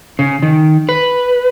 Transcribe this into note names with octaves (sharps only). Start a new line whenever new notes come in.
C#3
D#3
B4